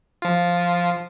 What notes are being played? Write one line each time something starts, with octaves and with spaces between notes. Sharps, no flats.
F3 F4